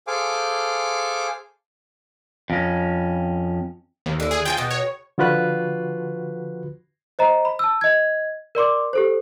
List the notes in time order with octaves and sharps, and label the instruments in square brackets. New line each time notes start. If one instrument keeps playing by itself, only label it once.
[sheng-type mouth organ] G#4 A4 C5 F5 G#5 D6
[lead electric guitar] F2 C#4
[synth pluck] D#2
[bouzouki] D3 E4
[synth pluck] G#4
[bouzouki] F4 G4 G#5 [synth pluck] G5
[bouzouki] B2 F#4
[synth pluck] C#5
[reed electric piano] D3 F3 F4 F#4 B4 F#6
[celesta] C5 D#5 A#5
B5
A5 E6
D#5 G#6
A#4 D5 C6 D6
G4 A4 C5